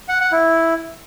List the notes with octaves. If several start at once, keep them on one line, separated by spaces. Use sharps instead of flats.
F#5
F#5
E4